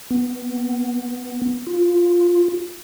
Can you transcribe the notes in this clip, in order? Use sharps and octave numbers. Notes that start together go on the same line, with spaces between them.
B3
F4